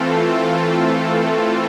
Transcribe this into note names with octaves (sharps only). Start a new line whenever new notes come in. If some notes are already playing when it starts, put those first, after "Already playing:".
Already playing: E3 A3 C4 F4 A4